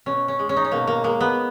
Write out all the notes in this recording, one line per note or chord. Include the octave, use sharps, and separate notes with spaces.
B2 C#4
C#4
G#3
C#4
D#4
C#4
B2 A#3
A#3
G#3 A#3
B3